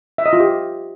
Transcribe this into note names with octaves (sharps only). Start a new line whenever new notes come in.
E5
D#5
F4
G4